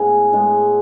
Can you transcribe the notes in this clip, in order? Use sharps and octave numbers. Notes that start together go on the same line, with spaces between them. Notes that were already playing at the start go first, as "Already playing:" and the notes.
Already playing: A2 G#3 B3 G#4
A2 G#3 B3